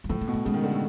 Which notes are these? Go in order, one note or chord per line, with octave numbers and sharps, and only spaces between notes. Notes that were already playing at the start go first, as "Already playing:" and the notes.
F#3
A2 F3
A#3
B2
A3
C#3 G#3
D#3
D3
A2